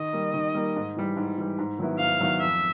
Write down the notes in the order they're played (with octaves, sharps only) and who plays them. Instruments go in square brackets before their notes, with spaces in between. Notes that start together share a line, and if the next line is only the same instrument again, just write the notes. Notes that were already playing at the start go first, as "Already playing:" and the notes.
Already playing: [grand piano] D#3 [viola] D#5
[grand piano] G3 A#3
D#3
G3 A#3
G#2
E3 G3
G#2
E3 G3
G#2
D#3 F#3 B3 E4
[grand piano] G#2 [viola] F5
[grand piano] D#3 F#3 B3 E4
[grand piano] F2 [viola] E5